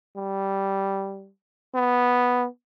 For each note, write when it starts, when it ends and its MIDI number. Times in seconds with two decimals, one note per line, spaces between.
0.16 1.30 55
1.75 2.47 59